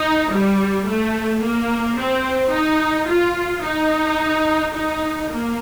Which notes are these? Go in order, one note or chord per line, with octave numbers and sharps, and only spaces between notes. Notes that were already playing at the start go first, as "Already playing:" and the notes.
Already playing: D#4
G3
A3
A#3
C4
D#4
F4
D#4
D#4
A#3